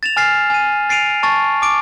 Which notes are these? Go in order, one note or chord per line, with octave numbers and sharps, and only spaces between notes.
A6 E7 F7
G#5 F6 A6 C7
G#5 D#7
A6 C7 D7 D#7 F7
A5 C#6 A6
D6 D7